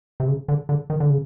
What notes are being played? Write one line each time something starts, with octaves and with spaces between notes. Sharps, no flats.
C3
C#3
D3
D3
D#3
D3
C#3